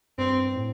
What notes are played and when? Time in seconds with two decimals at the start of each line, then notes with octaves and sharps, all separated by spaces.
0.18 G2 C4
0.56 A2